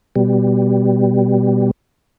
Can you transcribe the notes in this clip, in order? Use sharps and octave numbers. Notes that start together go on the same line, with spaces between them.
B2 G3